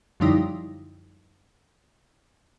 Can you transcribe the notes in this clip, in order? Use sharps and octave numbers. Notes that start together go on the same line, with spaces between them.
F#2 D3 F3 G3 D#4 E4